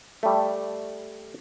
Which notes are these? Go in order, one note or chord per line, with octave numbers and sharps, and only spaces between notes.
G3 A3